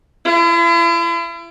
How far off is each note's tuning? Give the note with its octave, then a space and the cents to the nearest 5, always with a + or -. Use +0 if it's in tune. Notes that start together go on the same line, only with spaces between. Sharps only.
E4 +45